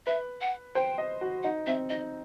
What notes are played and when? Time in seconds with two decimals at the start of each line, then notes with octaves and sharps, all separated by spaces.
0.07 B4 E5
0.41 F#5
0.75 C5 G5
0.98 D#5
1.21 F#4
1.43 D#4 F#5
1.67 C4 E5
1.90 D#4 D#5